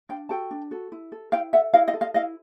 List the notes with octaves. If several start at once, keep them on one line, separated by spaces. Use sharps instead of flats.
D4 F5 G5
F#4 A4 G5 A5
D4
F#4 A4
E4
A4
E4 F5 G5
A4 E5 F#5
E4 D#5 F5
D#5 F5
A4
D#5 F5
E4 D#5 F5